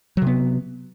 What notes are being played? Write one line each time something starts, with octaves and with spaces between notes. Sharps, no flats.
C3 F#3 B3